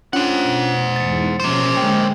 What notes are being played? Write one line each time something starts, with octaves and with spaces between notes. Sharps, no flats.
C#4 D4 F4 C5 F#5
B2
E2 G#2 A6 C#7
B2 F3 A#3 C#4 C5
D3 G#3 G5